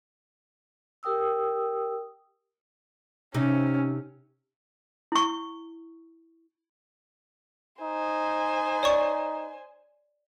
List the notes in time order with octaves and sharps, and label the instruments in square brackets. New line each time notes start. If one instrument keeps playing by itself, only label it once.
[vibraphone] G4 A#4 G5 D#6 E6
[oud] C3 D#4 [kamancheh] C#4
[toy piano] E4 C#6
[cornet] D#4 [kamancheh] C5 G#5
[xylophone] C#5 D5 C#6